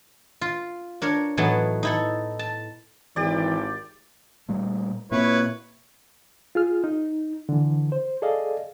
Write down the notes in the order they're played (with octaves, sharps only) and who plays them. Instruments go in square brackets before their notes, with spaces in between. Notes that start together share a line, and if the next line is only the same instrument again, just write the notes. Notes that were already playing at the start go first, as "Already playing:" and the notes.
[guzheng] F4
D4 A#4 C#5
A2 E3 F#3 B3 D#4 A5
D#4 E4 A4
A5
[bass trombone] G#1 [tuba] E3 [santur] G4 D5
[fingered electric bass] A#2 G3 A3
[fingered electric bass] A#2 A#3 C4 [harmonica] E4 B4 C#5
[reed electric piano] F4 G#4 F6
D#4
D3 E3
C5
G#4 A4 D5 D#5 F5